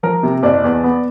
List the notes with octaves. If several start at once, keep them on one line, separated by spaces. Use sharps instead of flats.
F3 A#4
C3
F#1 D5
E2
B3